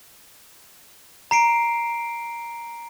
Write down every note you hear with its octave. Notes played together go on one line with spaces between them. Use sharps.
A#5 C7 D7